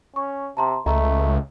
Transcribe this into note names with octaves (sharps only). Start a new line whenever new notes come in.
C#4 C#6
C3 A5 A#5 C6
C#2 A3 D#5 A#5